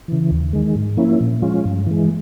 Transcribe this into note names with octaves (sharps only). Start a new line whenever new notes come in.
C#3 E3
D#2
D#3 G#3
G#2
F3 A#3 C#4 E4
A#2
F3 G#3 C#4 F4
G2
E3 G#3